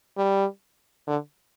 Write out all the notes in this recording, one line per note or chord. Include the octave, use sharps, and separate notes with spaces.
G3
D3